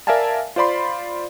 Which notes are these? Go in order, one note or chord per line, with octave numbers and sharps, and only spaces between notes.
A#4 D5 E5 F5 G#5 A5
F4 C5 D5 B5 C6